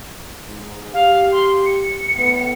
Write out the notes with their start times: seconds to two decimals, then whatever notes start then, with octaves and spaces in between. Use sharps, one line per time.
0.47 G#2
0.93 G4 F5
1.32 C6
1.66 C#7
2.15 A2 B3